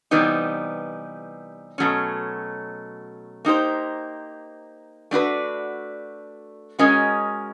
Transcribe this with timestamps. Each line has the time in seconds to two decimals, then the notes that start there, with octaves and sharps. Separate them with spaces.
0.11 C3 E3 G3 B3 D#4
1.78 B2 F#3 A3 C#4
3.45 A#3 D#4 G4 C5
5.11 A3 D4 F#4 B4
6.79 G#3 C#4 F#4 A#4 D#5